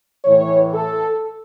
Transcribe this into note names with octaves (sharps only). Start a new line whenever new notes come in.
A2 E3 C#5
A4